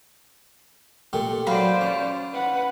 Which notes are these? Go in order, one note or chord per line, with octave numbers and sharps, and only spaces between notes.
A#2 A3 G4
F#3 C5 D5 F5 B5
C#4
B4 F#5